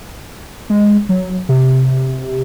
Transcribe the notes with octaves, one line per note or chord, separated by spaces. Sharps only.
G#3
F#3
C3